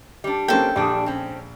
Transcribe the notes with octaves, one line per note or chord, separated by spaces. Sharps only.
G3 D4
A#3 C4 C#4 A4 G5
A#1 G3 D4 D#6
C4 C#4